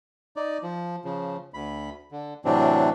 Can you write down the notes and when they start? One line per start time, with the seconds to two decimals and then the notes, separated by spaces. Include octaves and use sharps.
0.36 D#4 D5
0.63 F3
1.05 C#3 F3
1.54 D2 B5
2.12 D3
2.45 A2 C3 E3 F#3 C4 D4